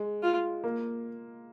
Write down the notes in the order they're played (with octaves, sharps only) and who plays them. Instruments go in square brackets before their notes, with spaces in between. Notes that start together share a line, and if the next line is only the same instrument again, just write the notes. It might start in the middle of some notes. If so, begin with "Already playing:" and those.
Already playing: [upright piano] G#3
[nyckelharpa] F4
[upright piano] A#3